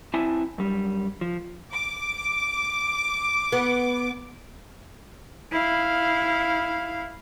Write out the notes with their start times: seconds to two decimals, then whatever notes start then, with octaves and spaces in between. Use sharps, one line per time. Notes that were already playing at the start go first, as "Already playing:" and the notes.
0.14 C4 E4 E5 G#5 A5
0.58 F#2 G3
1.21 F3
1.73 D6
3.52 B3
5.52 E4 F5